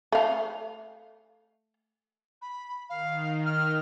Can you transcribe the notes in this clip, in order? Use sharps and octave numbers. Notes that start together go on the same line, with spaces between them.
A3 F5
B5
D#3 F5
F6